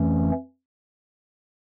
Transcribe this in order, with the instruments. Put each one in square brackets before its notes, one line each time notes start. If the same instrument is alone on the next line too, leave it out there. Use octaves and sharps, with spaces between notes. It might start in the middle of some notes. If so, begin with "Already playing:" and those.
Already playing: [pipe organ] F2 E3 A3 C#4